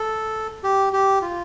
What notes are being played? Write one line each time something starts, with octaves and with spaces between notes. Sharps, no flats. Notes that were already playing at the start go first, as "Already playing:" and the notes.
Already playing: A4
G4
G4
F4